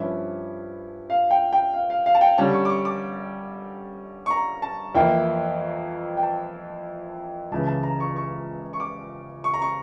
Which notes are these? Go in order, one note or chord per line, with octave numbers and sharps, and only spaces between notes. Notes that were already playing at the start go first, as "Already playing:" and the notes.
Already playing: G2 F3 C#4 E4
F5
G5
G5
F5
F5
F5
A5
G5
D3 G3 C#4 A5
C#6
D6
C#6
D6
C#6
A#5
A5
F2 E3 A#3 E4 G5
G5
A5
C#2 C#3 E3 A5
A5
A#5
C#6
C#6
C#6
D6
C#6
A#5
C#6